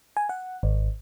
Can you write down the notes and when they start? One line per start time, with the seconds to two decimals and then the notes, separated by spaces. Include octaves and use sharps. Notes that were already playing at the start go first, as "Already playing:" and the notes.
0.17 G#5
0.29 F#5
0.63 G#1